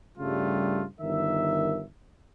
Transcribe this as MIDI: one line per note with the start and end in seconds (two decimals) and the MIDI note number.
0.18 0.85 43
0.18 0.85 49
0.18 0.85 55
0.18 0.85 57
0.18 0.85 65
1.00 1.83 31
1.00 1.83 51
1.00 1.83 70
1.00 1.83 76